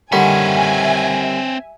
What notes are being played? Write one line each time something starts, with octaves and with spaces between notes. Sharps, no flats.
D3 D#3 G3 C4 C#5 E5 F#5 G#5